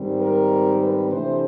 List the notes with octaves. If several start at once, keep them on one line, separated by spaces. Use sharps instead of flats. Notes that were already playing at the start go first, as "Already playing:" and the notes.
Already playing: G#2 D#3 G3 C4
A#4
B4
C3 E3 A3 D4 C5